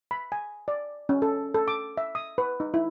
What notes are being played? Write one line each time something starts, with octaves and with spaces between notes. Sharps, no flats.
B5
G#5
D5
C#4
A4
A4
D6
E5
D#6
B4
D#4
E4